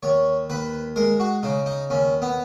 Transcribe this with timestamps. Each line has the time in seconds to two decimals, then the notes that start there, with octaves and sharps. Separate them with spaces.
0.03 D#2 C#5
0.50 D#2 B4
0.96 G#3 A#4
1.20 F#4
1.43 C#3 D#4
1.66 D#4
1.90 D#2 C#4
2.22 B3